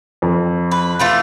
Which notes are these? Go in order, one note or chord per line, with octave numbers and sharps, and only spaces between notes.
F2
B4
E3 A3 F4